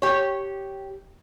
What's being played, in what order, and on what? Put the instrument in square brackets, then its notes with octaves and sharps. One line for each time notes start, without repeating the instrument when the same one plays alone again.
[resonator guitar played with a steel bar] G4 C#5